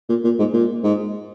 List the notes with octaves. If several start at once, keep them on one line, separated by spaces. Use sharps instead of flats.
A#2
A#2
G#2
A#2
G#2